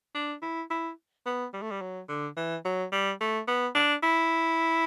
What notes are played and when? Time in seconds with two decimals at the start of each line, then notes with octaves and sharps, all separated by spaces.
0.14 D4
0.42 E4
0.70 E4
1.26 B3
1.53 G3
1.61 A3
1.71 G3
1.81 F#3
2.08 D3
2.36 E3
2.65 F#3
2.92 G3
3.20 A3
3.48 B3
3.75 D4
4.03 E4